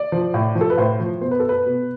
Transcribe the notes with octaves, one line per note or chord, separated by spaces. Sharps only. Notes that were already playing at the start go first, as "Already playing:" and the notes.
Already playing: D5
F3
A2
F3
A4
B4
A2 C5
F3
B2 C5
B4
A4
B4
B2